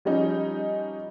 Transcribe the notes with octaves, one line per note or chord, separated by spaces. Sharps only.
F3 G3 C#4 D#4